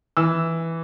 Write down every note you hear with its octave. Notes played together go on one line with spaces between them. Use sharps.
E3 E6